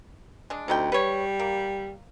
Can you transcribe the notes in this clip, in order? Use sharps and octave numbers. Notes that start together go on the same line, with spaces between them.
G#3 D4
D2 C3 D#4 G5
G3 B4 C#5
A#3